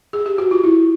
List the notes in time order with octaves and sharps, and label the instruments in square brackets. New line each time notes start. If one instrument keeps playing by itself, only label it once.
[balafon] G#4
G4
F#4
F4
E4